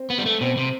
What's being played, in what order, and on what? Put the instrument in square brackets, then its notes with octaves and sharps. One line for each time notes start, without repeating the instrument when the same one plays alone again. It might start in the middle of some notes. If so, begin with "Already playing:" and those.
Already playing: [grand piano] C4
[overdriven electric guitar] B3
G3
A3
[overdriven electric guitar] B2 [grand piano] C4
[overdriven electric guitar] C3